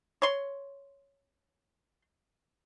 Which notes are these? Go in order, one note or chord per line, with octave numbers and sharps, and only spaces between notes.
C#5 C6